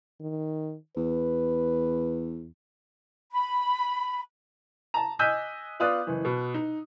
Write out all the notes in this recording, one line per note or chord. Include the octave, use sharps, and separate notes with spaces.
D#3
E2 B4
B5
A5 A#5
D#5 G#5 E6 F#6 G6 B6
B3 F4 D5 D#6 F#6
F#1 E3
B2
D#4